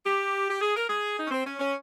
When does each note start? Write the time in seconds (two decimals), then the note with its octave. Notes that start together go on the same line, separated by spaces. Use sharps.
0.04 G4
0.49 G4
0.61 G#4
0.75 A#4
0.88 G#4
1.18 D#4
1.25 C#4
1.31 C4
1.45 C#4
1.59 C#4